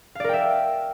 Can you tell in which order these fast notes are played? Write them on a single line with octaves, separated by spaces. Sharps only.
F5 D5 A#4 G5 E5